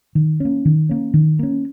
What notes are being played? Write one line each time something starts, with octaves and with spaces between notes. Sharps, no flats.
D#3
A#3 C#4
D#3
A#3 C#4
D#3
A#3 C#4